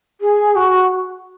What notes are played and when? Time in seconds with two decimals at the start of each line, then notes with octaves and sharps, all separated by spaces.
0.21 G#4
0.56 F#4